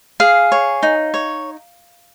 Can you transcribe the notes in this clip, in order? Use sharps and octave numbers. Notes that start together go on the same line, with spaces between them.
G#4 F5
C#5
D#4
C#5